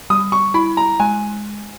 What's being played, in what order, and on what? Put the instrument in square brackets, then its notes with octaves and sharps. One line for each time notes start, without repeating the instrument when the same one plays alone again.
[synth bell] G3 [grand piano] D#6
[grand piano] C#6
[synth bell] E4 [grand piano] B5
[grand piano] A#5
[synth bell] G#3 [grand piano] G#5